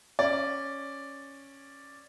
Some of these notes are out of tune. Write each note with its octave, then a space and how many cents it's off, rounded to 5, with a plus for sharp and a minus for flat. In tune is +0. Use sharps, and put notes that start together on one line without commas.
C#4 -5 D5 +0